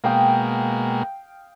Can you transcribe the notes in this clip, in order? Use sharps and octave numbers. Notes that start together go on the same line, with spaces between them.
B2 G#3 A#3 F5 G5 D#6